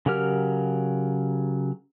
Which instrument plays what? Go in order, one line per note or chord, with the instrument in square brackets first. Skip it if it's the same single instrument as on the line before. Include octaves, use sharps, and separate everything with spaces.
[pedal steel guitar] C#3 F#3 G4 A#4 F6